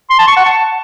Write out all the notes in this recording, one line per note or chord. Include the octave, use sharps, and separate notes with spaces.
C6
A5
C#6
F#5
A5